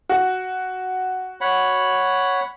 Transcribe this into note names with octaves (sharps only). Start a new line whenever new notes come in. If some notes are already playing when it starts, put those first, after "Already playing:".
F#4
C#5 F#5 B5